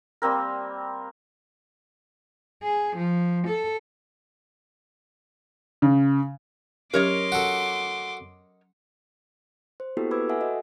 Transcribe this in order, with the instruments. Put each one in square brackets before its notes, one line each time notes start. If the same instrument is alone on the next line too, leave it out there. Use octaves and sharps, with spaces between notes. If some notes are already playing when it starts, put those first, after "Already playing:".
[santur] G3 A#3 C4 A#4
[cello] G#4
F3
A4
[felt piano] C#3
[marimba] F#3 C#4 G4 [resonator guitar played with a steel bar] A#4 C#5 D#5 [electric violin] C6 D6
[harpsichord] F#4 A4
[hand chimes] C5
A#3 B3 E4 F#4 G4 A4
B4 B5 D6 E6 G#6
A4 E5 F#5 G#5
F#4 D#5